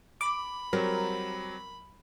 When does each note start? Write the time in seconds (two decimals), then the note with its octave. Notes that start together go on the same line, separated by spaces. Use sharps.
0.21 B5 D6
0.73 F#3 G3 C4 A#4